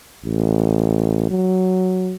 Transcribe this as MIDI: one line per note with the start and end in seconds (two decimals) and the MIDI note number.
0.25 1.27 33
1.31 2.16 54